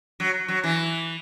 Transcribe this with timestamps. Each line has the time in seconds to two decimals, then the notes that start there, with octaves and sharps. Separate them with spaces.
0.20 F#3
0.48 F#3
0.64 E3